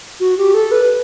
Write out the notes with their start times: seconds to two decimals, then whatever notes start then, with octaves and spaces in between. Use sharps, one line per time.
0.20 F#4
0.38 G4
0.54 A4
0.71 B4